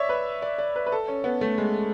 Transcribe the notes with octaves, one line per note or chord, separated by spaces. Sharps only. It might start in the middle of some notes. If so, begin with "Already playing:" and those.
Already playing: C#5 D5 E5
B4
D5
D5
B4
B4
A4
C#4
B3
A3
G#3